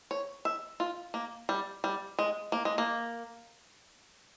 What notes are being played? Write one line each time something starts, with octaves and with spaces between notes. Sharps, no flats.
C#5
E5
F4
A#3
G3
G3
G#3
A#3
G#3
A#3